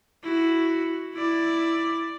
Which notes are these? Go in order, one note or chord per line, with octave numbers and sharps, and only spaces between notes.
E4 F#4
E4 D5